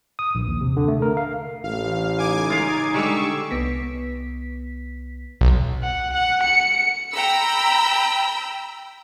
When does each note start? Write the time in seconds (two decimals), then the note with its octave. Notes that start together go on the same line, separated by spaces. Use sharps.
0.19 D#6
0.35 A#1
0.47 D#2
0.61 C3
0.77 D3
0.88 A3
1.02 A#4
1.17 F5
1.64 A1 F5
2.18 C#3 D#4 G#5 D6 G#6
2.50 F4 F5
2.94 D3 G3 G#3 C#6 D6 E6
3.51 C2 B3 B6
5.41 B1
5.83 F#5
6.13 F#5
6.43 C#7
7.13 G5 A#5 B5 E6